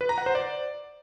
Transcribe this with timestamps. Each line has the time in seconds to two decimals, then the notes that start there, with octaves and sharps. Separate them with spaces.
0.01 B4
0.09 A#5
0.18 F#5
0.26 C5
0.35 D5